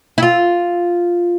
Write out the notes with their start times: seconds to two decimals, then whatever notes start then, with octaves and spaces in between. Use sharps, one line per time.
0.18 E4
0.22 F4